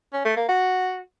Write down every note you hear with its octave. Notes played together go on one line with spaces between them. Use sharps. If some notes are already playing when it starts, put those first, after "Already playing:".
C#4
A3
A#3
F#4